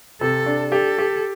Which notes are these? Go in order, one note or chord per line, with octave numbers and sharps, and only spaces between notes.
C3 A4
D4
G4 A4
G4